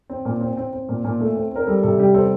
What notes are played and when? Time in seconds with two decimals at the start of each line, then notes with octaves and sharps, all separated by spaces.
0.10 C4
0.25 A#2
0.41 C4
0.57 C4
0.73 C4
0.89 A#2
1.04 A#2
1.20 A3
1.36 C4
1.52 C4 A#4
1.67 G3 A4
1.83 C3 A4
1.98 G3 G4
2.14 C4 A4